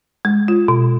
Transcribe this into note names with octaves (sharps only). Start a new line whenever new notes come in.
G#3
F4
B2